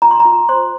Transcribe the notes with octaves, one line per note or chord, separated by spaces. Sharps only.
F4 A#5
C6
A#5
F4
C5 C6